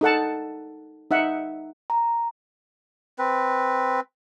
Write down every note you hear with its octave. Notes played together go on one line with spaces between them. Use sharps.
D#4 A4 F#5 A5
D#4 E5 F#5
A#5
C4 B4